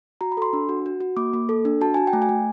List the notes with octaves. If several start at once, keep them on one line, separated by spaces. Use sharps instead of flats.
F#4 A#5
B5
A4 C6
D4
F#4
F#4
F#4
A#3 D6
A#3
A4
D4
F#4 A5
F#4 G#5
G5
A3
G#5
A3